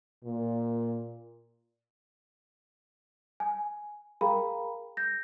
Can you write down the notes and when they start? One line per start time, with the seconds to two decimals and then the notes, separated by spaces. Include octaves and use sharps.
0.24 A#2
3.40 G#5
4.21 G#4 A#4 F5 G5 A#5 B5
4.97 G6 A#6